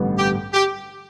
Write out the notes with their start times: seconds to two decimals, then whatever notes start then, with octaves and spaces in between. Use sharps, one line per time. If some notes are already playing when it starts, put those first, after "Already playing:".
Already playing: A1 G2 D3 G3 B3
0.18 G4
0.54 G4